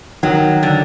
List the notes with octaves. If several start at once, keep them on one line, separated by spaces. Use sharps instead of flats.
D#3 F#3
D3